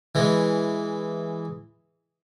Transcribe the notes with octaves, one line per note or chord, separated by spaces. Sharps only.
E3 G#3